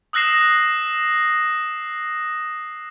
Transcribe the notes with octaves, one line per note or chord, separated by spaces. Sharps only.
D#6 E6 F#6 A#6 C7 E7